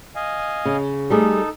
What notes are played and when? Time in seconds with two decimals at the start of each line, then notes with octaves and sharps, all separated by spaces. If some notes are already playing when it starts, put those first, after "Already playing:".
0.15 D#5 F5 G#5
0.65 C#3
1.10 G3 A3 D#4 G#4 A4